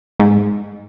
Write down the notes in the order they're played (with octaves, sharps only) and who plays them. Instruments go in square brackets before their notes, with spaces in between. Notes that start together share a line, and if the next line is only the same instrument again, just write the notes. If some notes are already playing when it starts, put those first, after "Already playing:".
[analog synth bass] G#2